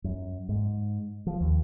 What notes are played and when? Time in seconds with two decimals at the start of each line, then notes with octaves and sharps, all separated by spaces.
0.04 F#2
0.49 G#2
1.27 F3
1.40 D#2